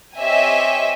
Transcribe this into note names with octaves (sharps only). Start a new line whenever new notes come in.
C4 G4 C#5 D#5 E5 G#5